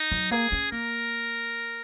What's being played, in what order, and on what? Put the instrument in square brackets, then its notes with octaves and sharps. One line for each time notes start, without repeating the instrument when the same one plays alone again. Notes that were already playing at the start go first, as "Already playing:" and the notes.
Already playing: [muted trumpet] D#4
[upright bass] F#3
[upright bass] A#3 [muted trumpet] G#4
[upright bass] C#4
[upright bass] A#3 [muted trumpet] A#4